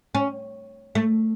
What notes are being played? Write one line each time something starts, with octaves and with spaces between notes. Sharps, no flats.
C#4
A3